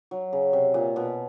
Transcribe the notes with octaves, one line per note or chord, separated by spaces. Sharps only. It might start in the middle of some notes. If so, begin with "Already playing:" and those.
F#3
C#3
C3
A#2
B2